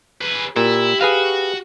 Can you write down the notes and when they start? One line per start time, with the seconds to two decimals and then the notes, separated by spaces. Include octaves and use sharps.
0.21 G#4 B4
0.56 A#2 E4 G4
1.01 F#4 G#4 B4 F5